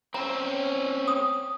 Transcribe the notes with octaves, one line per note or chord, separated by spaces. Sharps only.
C4 C#4 A#5
D#6